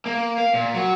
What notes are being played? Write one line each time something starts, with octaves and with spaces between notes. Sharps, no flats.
A#3
F5
A#2
F#3